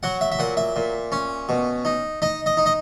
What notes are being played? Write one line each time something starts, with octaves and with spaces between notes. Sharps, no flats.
F#3 F#5
E5
E5
A#2 F#5
E5
A#2
C#4
B2
D#4
D#4 D#5
D#5
D#4
D#5